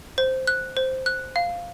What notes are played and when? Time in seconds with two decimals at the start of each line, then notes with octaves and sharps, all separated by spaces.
0.18 C5
0.47 F#6
0.77 C5
1.06 F#6
1.36 F5